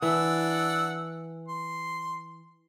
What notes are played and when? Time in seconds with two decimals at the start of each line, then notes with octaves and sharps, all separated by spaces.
0.02 E3 D4 F#5 E6
1.48 C6